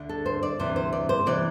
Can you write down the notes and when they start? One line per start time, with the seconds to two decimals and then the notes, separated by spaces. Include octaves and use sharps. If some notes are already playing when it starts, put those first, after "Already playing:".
Already playing: D2 D3
0.09 A4
0.26 C5
0.43 D5
0.59 D2 C3 E3 C5
0.76 C5
0.93 D5
1.09 C5
1.26 C3 E3 D5